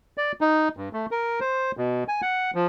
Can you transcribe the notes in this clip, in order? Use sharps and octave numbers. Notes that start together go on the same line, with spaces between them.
D5
D#4
G2
A3
A#4
C5
B2
G#5
F#5
F3